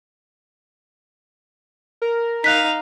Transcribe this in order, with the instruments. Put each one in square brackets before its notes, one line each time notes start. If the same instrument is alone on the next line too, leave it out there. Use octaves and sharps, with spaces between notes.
[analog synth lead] A#4
[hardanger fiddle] D#4 F5 [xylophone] F#6 B6